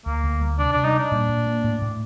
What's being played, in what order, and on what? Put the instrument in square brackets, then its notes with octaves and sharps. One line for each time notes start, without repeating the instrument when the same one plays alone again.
[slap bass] D2 [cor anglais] A#3
[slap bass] D2
G3
[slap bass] C3 [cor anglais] D4
[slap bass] C3 [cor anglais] D4
[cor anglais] D#4
[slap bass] G3
[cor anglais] D4
[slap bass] A#2
A#2
A#3
A2
A2